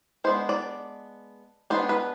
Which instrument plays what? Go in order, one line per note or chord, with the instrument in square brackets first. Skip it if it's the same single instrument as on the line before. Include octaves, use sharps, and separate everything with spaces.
[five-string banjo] G#3 B3 D4 C5
D5
G#3 B3 D4 C5
B4